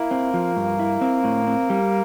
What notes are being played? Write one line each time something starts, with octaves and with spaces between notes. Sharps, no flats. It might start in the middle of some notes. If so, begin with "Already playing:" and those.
Already playing: A#3 E4
C4
F3
G2
E4
C4
A2
C4
G3